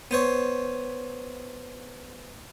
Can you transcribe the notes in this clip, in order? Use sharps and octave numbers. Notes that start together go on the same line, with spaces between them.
B3 C5 C#5